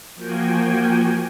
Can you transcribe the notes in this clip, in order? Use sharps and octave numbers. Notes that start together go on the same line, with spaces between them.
F3 A#3 F#4 G5 G#5